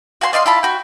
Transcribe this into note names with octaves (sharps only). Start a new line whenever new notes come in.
F#4 F5 G#5 C6
D5 D#5 F5 C6
E4 F4 A5 B5
F#4 G5